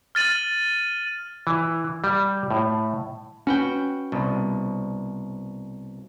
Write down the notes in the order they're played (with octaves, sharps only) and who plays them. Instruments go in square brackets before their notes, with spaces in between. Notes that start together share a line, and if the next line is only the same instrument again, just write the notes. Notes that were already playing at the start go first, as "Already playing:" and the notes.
[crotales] F6 A6 D#7 F#7
[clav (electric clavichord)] E3
G3
A2
[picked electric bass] C#4 [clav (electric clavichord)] F#4 B4 G5
[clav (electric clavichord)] C2 B2